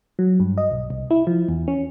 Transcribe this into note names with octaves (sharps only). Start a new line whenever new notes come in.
F#3
G2
D#5
B1
C2
E4
F3
E2
C#4